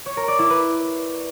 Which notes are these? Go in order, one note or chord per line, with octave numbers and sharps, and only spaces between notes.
C#5
A#4
D5
E4
B4